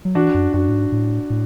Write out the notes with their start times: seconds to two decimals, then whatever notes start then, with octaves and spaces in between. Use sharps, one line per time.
0.05 F#3
0.15 E3 D4 F#4
0.34 F#2
0.53 F#2 D4 F#4
0.69 A2
0.73 G#2
0.92 A2
1.30 A2